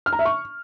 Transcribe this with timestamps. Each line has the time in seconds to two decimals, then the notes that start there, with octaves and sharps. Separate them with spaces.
0.06 F6
0.13 A#5
0.19 E5
0.25 C#6